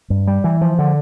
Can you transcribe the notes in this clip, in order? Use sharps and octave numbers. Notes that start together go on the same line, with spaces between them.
G2
G3
E3
F3
D3